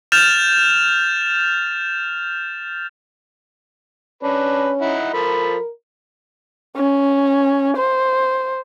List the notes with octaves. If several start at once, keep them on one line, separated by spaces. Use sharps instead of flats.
F6 G6 A6 E7 F7
C#4 D4 B4
D#4 E4 F#5
F3 A4 A#4 B5
C#4
C5